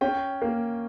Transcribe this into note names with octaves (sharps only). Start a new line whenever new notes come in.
C#4 G5
A#3